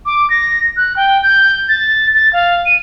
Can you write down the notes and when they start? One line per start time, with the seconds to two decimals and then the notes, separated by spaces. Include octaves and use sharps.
0.06 D6
0.30 A#6
0.77 F#6
0.96 G5
1.23 G6
1.69 A6
2.15 A6
2.33 F5
2.66 D#7